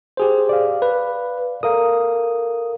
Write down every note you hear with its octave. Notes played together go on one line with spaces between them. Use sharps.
G4 G#4 C5
D5 F5
B4
A4 A#4 F5 D#6